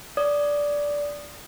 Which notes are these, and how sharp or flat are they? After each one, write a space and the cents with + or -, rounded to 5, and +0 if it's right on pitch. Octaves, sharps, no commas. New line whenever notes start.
D5 -10 D#6 -15